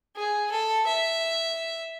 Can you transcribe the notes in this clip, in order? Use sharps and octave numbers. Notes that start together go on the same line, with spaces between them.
G#4
A4
E5